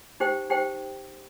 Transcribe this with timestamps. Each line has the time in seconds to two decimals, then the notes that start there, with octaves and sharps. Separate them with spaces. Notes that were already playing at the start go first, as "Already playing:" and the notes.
0.20 D#4 G4 C5 G5
0.50 D#4 G4 C5 G5